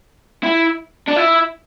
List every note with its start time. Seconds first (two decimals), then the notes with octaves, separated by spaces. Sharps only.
0.43 E4
1.08 D4
1.17 E4